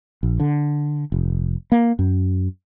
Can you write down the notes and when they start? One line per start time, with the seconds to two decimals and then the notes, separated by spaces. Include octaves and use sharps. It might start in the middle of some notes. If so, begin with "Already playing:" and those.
0.23 A#1
0.40 D3
1.12 F1
1.72 A#3
1.99 F#2